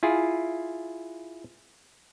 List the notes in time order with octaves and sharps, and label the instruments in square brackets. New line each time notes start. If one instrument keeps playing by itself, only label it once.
[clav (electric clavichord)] E4 F4 G#4